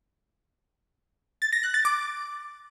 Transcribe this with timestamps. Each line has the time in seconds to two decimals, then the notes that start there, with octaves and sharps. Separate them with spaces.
1.42 A6
1.53 A#6
1.63 F#6
1.74 A6
1.85 D6